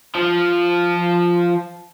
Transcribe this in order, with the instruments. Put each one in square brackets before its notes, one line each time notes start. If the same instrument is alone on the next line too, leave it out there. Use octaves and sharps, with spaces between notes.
[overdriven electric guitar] F3 F4